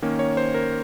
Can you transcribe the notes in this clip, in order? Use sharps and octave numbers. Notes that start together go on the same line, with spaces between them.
D#3 A#3 C#4
C#5
C5
A#4